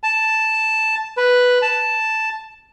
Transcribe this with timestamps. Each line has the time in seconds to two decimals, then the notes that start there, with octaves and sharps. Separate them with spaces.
0.03 A5
1.17 B4
1.62 A5